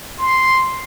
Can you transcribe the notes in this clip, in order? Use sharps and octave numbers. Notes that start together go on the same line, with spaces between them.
C6